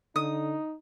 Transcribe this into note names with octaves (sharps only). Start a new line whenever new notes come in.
D3 D#4 D#6